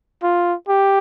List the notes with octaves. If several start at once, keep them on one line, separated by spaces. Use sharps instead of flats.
F4
G4